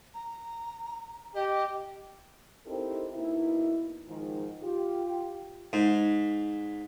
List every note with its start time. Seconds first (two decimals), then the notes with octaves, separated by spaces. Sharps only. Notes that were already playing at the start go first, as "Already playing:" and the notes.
0.14 A#5
1.35 G4 D#5
2.66 C4 D#4 E4 G4 A4 A#4
3.13 B2 A#3 D#4 E4
4.07 G#2 D#3 F3
4.63 F4 G4
5.73 G#2